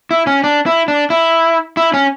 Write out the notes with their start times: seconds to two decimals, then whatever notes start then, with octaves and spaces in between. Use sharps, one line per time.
0.11 E4
0.27 C#4
0.44 D4
0.66 E4
0.88 D4
1.10 E4
1.77 E4
1.94 C#4